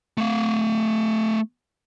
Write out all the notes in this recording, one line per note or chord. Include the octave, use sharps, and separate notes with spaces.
A3 F5